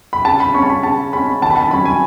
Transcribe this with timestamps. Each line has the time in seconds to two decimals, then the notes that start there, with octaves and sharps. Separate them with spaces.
0.13 B5
0.25 C#3 A5
0.40 B5
0.54 G#3 C#4 C#6
0.62 A5
0.69 B5
0.83 C#3 A5
1.12 G#3 C#4 B5
1.42 D#3 A5
1.50 B5
1.57 A5
1.71 F#3 C#4 B5
1.85 G#5